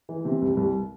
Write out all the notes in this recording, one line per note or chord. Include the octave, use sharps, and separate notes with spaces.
E3
C3
C2
C2